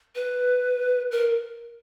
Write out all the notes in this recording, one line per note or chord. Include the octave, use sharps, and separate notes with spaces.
B4
A#4